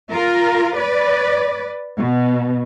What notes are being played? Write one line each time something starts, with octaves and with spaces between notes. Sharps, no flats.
F4 A#4
B4 D5
B2